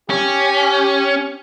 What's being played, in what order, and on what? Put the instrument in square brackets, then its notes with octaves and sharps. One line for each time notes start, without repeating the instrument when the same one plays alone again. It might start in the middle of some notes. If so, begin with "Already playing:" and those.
[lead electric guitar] C#4 [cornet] G4